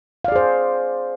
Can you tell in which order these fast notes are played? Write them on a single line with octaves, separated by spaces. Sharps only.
F5 D5 G#4 C5